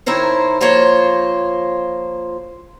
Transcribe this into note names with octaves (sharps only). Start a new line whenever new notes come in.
D#3 E4 A#4 C5 C#5
F3 A#3 F4 C5 C#5